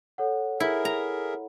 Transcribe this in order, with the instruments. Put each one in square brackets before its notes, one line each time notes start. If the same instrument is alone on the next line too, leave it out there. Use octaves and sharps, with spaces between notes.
[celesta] A4 C#5 F#5
[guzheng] E4 [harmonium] G#4 A#4 E5
[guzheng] A#5